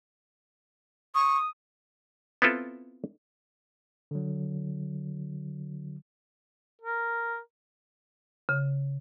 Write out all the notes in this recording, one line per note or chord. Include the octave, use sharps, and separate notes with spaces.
C#6 D#6
B3 C4 E4 F4 A4
D3 F#3
A#4
C#3